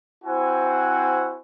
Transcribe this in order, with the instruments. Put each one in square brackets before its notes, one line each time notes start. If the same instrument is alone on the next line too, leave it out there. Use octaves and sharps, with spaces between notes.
[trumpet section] C4 E4 F#4 C5 F#5 G#5